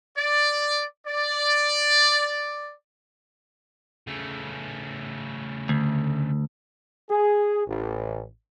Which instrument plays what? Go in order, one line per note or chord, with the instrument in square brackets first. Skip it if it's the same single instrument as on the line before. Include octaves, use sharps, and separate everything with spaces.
[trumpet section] D5
D5
[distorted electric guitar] C#3 A3
[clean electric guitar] D2
[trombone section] G#4
A1